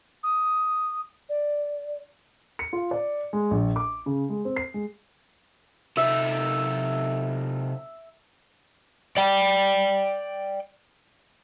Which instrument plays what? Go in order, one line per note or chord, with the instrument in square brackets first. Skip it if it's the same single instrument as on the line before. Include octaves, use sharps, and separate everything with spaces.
[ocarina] D#6
D5
[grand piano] C#7
F4
D5
G#3
A#1
D6
C#3
G#3
C4
C7
G#3
[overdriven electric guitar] C3 D#4 [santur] E5
[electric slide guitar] D5 G5